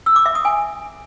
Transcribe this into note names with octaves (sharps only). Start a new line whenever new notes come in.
E6
D6
E5
D#6
G#5